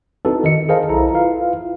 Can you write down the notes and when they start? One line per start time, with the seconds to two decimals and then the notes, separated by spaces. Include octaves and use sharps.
0.25 C4 D#4 E4 F#4 A4 B4
0.44 D#3 D#5 C#7
0.69 G#4 A#4 C5 D#5 F5 A5
0.89 B1 E4 A4 A#5
1.12 E4 F4 B4 F5